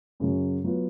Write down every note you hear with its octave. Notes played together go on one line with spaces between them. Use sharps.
F#2 C#3 F#3
F#3 B3 F4